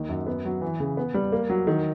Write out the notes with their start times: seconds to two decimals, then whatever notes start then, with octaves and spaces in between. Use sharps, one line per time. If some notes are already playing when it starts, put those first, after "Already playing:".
Already playing: D#2 D#3
0.09 F#2
0.26 B3
0.45 F#3
0.61 E3
0.80 C#3
0.97 B3
1.14 G3
1.32 A#3
1.50 F#3
1.67 D#3